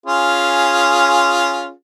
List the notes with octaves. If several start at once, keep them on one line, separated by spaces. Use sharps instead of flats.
C#4 F4 G#4